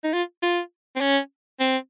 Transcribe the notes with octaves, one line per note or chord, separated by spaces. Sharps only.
D#4
F4
F4
C4
C#4
C4